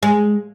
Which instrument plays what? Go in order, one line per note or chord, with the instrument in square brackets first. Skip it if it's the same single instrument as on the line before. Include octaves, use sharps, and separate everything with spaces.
[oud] G#3